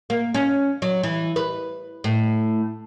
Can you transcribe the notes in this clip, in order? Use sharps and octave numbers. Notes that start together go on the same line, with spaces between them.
A#3
C#4
F#3
E3
B4
A2